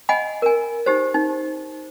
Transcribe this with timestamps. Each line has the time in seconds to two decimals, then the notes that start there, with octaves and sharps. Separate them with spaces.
0.09 D#5 F#5 G#5 B5
0.42 A#4 G#5
0.86 D#4 G4 C5
1.14 D#4